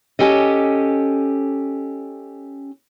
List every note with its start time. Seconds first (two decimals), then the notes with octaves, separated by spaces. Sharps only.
0.19 C#4 G4 A4 D#5